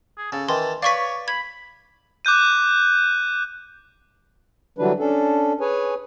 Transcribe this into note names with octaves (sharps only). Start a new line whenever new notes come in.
G#4
C#3 A4
D#3 E3 A5 C6
B4 C#5 D5 F5 C#6 B6
B5 G#6
D6 F#6 G6 D#7
D3 E3 F#3 G3 D4 B4
C#4 D4 A4
G#4 B4 C#5 G#5